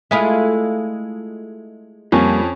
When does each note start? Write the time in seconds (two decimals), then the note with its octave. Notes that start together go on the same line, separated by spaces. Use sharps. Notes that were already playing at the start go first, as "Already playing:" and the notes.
0.11 G#3 A3 E4 F4 G#4 E5
2.12 F2 G3 A#3 C#4